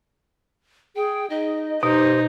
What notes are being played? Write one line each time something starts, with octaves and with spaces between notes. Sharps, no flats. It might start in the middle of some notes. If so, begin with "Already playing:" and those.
G#4 G5
D#4 D#5
B2 D#4 G4 C5